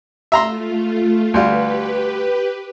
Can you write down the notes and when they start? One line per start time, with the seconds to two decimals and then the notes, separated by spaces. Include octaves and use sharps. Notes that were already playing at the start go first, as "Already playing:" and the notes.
0.32 A3 F4 E5 A#5 C6
1.34 D2 G3 F4 G4 B4